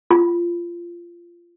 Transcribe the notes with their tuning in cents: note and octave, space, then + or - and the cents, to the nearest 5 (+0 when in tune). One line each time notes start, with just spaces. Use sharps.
F4 -20